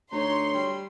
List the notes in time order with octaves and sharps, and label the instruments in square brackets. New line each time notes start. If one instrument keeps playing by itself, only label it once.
[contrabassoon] D2 [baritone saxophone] D#4 [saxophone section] C#5 [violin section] C6
[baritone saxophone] G3